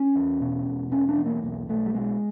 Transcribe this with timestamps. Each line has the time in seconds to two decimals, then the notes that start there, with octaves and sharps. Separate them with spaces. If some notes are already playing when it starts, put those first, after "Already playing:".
Already playing: C#4
0.16 E2
0.40 B2
0.66 E1
0.91 E1 C#4
1.09 D4
1.18 E2
1.26 A#3
1.42 B1 A#3
1.69 B1 A3
1.86 G3
1.94 B2 G#3